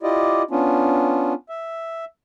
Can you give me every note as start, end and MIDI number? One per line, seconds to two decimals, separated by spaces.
0.03 0.43 64
0.03 0.43 65
0.03 0.43 67
0.03 0.43 74
0.03 0.43 75
0.51 1.33 59
0.51 1.33 61
0.51 1.33 62
0.51 1.33 65
1.49 2.05 76